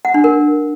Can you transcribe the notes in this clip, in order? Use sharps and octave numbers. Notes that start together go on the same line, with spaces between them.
F#5
D4
A#4